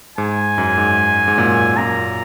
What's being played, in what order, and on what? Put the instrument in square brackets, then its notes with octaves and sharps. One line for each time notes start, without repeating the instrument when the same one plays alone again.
[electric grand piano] G#2 [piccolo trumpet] G#5
[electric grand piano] F#2
G#2
G#2
F#2 A#2
[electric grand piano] F#2 A#2 [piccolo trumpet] A#5